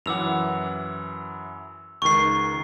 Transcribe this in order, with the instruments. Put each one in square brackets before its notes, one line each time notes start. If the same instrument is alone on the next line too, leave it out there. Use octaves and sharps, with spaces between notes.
[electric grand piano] F#2 E3 F#5 [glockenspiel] D6 E6 F7
[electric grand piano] C#2 D#3 [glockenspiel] C#6 C7